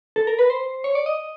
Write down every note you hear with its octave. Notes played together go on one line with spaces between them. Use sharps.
A4
A#4
B4
C5
C#5
D5
D#5